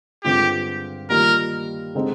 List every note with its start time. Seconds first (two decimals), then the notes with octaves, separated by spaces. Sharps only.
0.24 G2 D3 G#3 C4 F4 G4
1.10 D#3 G3 A#3 F4 A#4
1.95 D3 G#3 C4 D#4 G4